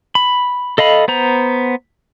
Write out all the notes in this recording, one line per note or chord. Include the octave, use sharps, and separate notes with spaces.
B5
A4 D#5 F5 B5
B3 C5 A#5